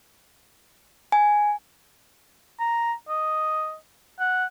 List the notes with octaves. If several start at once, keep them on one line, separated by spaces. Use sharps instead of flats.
G#5
A#5
D#5
F#5